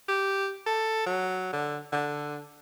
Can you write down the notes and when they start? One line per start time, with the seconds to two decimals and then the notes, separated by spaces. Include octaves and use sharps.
0.09 G4
0.66 A4
1.07 F#3
1.53 D3
1.92 D3